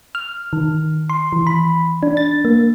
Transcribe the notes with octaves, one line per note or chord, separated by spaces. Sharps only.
F6
D#3
C6
E3
B5
D4
A6
A#3